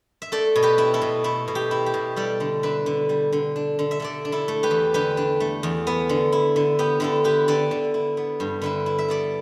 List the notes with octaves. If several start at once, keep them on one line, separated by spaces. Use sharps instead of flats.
E5
A3 A4 D5
B2
G4 B4
E4
E4 A4
B2
A3 E4
B2
G4
E4
G4
B2
G3 A4 D5
D3
D4 B4 E5
D3
G3
D3
D4
D3
E5
D3 A4 D5
D4
E4 A4
A3
G4 B4
E2
D3 G4 B4
D4
A3
E2
B3
D3
E4
D3
B3 G4
D3 E4 A4
E4 G4 B4
D3 A4 D5
D3
E4
B3
G2
D3 B4 E5
E4
E5
B3 A4 D5